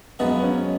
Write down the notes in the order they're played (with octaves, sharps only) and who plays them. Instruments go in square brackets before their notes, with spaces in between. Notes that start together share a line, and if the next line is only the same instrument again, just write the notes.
[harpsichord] F#2 F3 G#3 D#4 F#4 [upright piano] B3
[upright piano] C#4